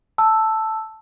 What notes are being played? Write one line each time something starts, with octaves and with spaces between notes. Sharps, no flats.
A5 E6